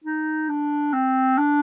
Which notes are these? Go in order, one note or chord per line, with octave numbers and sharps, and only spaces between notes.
D#4
D4
C4
D4